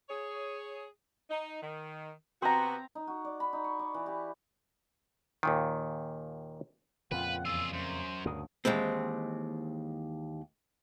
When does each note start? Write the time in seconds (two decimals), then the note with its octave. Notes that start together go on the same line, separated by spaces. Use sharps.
0.09 G#4 C#5
1.30 D#4
1.61 D#3
2.42 C3 B3 C4 F#4 A#5
2.95 D#4
3.07 F#4
3.25 D5
3.40 B5
3.53 D#4
3.64 C#6
3.79 D5
3.94 E3
4.06 G4
5.43 D#2 A#2 D#3
7.11 F2 A#2 C#3 F4 B4 F#5 G5
7.45 E2 F4 G#4 E6
7.73 F#2 C5
8.25 D2 G2 C#3 F#4 A#4 D#6
8.65 D#2 E3 G#3 C4